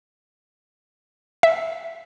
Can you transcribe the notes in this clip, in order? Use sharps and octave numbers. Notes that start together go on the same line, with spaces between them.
E5